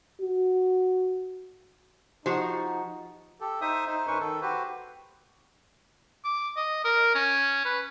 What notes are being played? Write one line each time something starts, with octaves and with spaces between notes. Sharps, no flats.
F#4
F3 D#4 F#4 G4 C5 F#5
G4 A4
D#4 C5 E5 D#6
D#4 C5
F#2 C#4 D#4 B4 C5 C#6
D#3 A4
F#4 G4 B4 C5
D6
D#5
A#4
C#4
B4